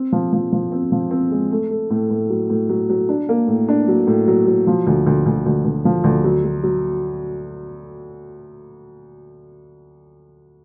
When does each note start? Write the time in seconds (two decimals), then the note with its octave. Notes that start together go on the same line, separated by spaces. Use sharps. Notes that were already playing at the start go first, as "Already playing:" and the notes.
Already playing: C4
0.12 F3
0.33 F3
0.53 F3
0.72 C4
0.92 F3
1.11 C4
1.31 G#3
1.51 A3
1.71 A3
1.90 A2
2.10 A2
2.30 F#3
2.49 A2
2.69 F#3
2.89 F#3
3.09 D4
3.29 A#3
3.47 A2
3.68 D4
3.88 F#3
4.07 A2
4.28 F#3
4.47 F#3
4.67 F3
4.87 D2
5.07 D2
5.26 D2
5.46 D2
5.65 D2
5.85 F3
6.04 D2
6.24 F#3
6.45 F#3
6.63 F#3